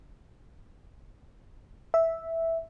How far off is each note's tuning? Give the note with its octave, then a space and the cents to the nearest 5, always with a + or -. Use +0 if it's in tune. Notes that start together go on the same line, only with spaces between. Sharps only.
E5 -5